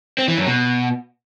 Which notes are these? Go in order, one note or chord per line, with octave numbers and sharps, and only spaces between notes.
C4
E3
F#2
B2